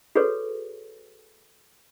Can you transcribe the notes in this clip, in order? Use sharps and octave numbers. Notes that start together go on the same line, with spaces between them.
F#4 G#4 A4 B4 C#5